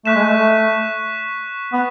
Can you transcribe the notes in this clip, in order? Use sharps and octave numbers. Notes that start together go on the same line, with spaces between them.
A3 C#6 F#6 B6 E7
G#3
A3
B3